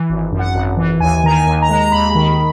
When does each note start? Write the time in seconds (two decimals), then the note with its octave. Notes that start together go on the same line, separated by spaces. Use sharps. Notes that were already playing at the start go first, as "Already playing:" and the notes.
Already playing: E3
0.09 G#1
0.32 F#2
0.39 F#5
0.54 G#1
0.77 E3
1.00 D#2 G#5
1.24 D#3 A#5
1.32 G#5
1.47 D#2
1.62 A#5
1.69 G#3
1.81 A#5
1.92 D#2 B5
2.15 D#3